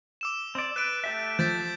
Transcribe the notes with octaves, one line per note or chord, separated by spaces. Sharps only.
D6 E6 E7
C4 D5
B4 F#6 A6 D7
A3 G4 E5
F3 G6 A6 B6